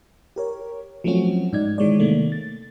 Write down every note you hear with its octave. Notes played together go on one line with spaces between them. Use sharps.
G4 A#4 C#5
F3 F#3 A3 C4 C#4 F#4
G#2 D#4 D5 G#6
D#3 E3 G#3 C#5 D5
C3 D#3 A3 A#3
A6